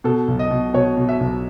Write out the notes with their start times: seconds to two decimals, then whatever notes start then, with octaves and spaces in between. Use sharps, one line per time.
0.04 B2 A4
0.28 B1
0.39 D#5
0.51 B2
0.74 B2 C#5
0.97 B2
1.09 E5
1.20 B1